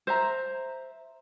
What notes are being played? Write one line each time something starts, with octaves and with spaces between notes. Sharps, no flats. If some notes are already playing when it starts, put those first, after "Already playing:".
C5 E5 A#5